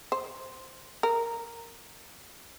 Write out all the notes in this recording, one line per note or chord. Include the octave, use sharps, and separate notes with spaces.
C5
A#4